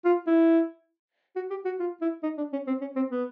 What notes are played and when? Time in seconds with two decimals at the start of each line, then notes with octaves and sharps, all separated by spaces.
0.05 F4
0.27 E4
1.36 F#4
1.51 G4
1.65 F#4
1.80 F4
2.01 E4
2.23 D#4
2.38 D4
2.53 C#4
2.67 C4
2.81 C#4
2.96 C4
3.10 B3